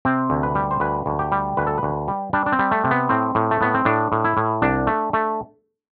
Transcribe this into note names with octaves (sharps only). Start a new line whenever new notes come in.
C3 C4
D2
B4
G3
C5
D2 B4
D2
G4
G3
D2 B4
A4
B4
D2
G3
G3 D4
D4
C4
G3
A3
C3
B3
A2 C4
A2
A3
A2 B3
C4
A2 D4
A2
E4
A2
C2 D4
A3
A3